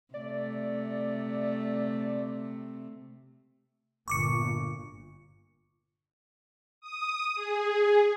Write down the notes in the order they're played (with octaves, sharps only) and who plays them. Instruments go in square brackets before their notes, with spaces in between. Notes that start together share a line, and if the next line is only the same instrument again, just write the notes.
[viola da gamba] C3 A3 [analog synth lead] D5
[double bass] G1 A#2 [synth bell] C#6 D6 C#7
[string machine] D#6
G#4